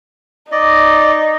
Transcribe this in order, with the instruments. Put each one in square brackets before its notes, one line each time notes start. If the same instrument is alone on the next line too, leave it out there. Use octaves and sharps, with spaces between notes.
[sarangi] D#4 [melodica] D5 D#5